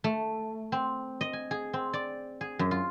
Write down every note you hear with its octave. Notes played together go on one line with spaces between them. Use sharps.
A3
C4
D#5
G#5
G#4
C4
D5
G#4
F#2
F4